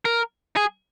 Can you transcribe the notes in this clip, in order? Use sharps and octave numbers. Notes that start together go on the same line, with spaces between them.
A#4
G#4